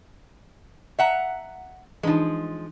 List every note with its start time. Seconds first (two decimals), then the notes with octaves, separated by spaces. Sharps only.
0.99 E5 F#5 A#5
2.03 E3 F3 G#3 D4 D#4